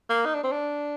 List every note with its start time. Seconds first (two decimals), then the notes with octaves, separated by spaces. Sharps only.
0.09 A#3
0.26 D#4
0.34 D4
0.44 C4
0.52 D4